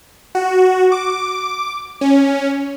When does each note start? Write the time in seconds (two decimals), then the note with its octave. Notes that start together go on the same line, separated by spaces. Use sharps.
0.35 F#4
0.92 D6
2.01 C#4